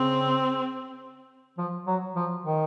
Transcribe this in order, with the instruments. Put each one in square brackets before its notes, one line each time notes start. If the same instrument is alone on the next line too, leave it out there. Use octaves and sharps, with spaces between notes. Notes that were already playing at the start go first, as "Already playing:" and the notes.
Already playing: [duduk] C#3 [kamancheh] C4
[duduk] F3
F#3
F3
D#3